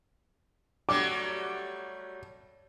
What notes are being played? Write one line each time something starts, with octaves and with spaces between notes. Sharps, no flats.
F#3 G3 A3 D6